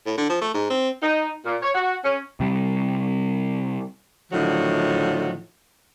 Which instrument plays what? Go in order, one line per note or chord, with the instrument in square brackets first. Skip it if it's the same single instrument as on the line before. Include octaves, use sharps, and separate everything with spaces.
[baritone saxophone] A2
D3
F3
A3
G#2
C4
[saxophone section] D#4
A#2
C#5
F#4
C#4
[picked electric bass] C3 G3
[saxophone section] A2 D3 D#3 F3 F#3